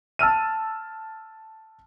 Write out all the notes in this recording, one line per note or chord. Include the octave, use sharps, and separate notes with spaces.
A5 E6 F6 D#7